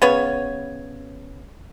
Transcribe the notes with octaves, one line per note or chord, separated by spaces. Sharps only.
C#3 B3 C#5